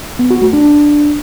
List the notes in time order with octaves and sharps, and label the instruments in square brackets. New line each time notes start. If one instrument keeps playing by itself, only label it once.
[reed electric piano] B3
F#4
A3
D4